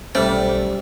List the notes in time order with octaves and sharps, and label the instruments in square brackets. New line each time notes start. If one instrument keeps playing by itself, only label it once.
[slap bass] B1 C#4 [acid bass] G3 [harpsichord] A3 [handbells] C5